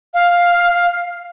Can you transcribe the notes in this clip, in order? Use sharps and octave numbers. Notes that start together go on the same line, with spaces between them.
F5